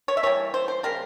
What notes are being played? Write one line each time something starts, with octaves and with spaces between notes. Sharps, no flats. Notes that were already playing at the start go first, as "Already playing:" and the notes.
C#5
E5
E3 G3 A#3 C#5
C5
C5
C#3 G3 A#3 A#4